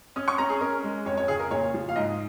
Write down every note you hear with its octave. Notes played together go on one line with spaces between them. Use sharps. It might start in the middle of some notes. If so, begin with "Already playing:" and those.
C#4 D#6
C#6
C#4 A#5
G#4
C#4 A#4
G#3
F2 C#5
C#5
C#3 G#4
A#4
A#2 C#5
F3
F5
G#2 D#5